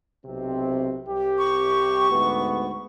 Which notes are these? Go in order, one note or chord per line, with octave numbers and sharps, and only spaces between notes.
B1 C3 C4
C2 G4
C#6
D2 G#2 B3